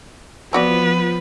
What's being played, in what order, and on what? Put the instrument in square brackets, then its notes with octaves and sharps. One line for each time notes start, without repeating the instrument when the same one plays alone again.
[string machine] F3 [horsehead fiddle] B3 [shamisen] C4 F#4 D5 [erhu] B4